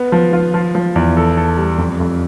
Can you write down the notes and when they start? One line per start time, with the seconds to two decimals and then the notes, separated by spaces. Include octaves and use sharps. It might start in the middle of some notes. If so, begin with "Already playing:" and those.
Already playing: B3
0.12 F3
0.33 F4
0.54 F3
0.75 F3
0.96 E2
1.17 A4
1.37 A4
1.58 G3
1.78 F2
2.00 F2